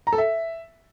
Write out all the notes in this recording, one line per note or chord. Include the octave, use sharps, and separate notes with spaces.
A#5
A4
E5